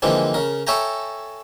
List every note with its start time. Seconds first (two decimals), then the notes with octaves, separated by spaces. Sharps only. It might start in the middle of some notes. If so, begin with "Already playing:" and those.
0.02 D3 E3 F3 G#3 A#3 C4
0.34 C#3 A#4
0.67 A4 C#5 E5 G5 G#5 A#5